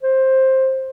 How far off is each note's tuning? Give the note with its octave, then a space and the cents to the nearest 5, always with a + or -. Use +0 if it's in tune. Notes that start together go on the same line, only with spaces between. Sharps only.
C5 +10